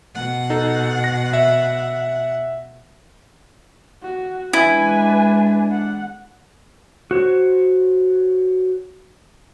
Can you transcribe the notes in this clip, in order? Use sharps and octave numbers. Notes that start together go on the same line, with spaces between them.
B2 F#5
D#4 A4
A#6
E5
F#4
G#3 D4 E4 B4 G#5
F#5
F#4 C5 C#5